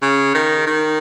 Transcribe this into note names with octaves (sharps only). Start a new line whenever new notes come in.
C#3
D#3
D#3